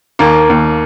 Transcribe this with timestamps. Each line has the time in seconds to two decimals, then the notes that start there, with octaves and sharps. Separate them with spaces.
0.19 D#2 A#3
0.50 D#2